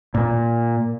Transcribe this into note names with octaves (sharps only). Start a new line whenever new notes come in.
A#2